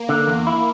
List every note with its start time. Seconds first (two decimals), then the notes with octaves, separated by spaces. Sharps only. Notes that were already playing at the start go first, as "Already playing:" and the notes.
Already playing: A#3
0.09 D3
0.27 E2
0.47 E4